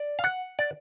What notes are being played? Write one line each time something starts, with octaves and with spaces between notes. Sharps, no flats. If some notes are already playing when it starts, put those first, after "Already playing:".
Already playing: D5
F5
F#5
D5